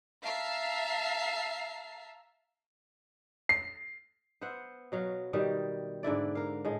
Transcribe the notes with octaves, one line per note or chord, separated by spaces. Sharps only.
E5 F5 A5 A#5 C7
C7
B3 C5 E5 F#5
B2 F#3 F5
B2 D#3 G3
G#2 D3 E4 D5
A#4 F5
A2 G#3